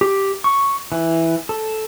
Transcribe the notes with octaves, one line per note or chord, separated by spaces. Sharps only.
G4
C#6
E3
A4